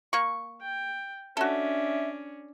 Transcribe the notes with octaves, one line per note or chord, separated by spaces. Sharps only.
A#3 C#6
G5
C#4 D4 F#4 A4 E5